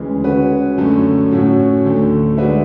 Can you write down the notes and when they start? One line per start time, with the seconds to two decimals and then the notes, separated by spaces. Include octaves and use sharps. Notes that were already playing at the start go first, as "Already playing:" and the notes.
Already playing: D2 C#3 E3 G#3
0.24 G#3 C#4 F#4 B4
0.77 F#2 D3 A3 C#4
1.31 A2 F#3 C#4 F#4 C#5
1.85 D2 D3 A3
2.37 G#3 D4 F#4 B4 E5